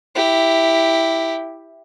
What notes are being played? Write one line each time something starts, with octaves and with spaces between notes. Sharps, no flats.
E4 G4